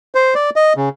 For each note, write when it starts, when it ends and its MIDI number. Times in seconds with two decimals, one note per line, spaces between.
0.15 0.34 72
0.35 0.50 74
0.56 0.73 75
0.77 0.89 49